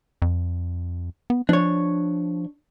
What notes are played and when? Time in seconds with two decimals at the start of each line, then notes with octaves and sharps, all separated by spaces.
0.22 F2
1.30 B3
1.49 F3 D4 C#5